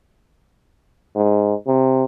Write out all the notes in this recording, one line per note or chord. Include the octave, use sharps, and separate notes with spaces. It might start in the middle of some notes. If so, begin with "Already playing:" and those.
G#2
C3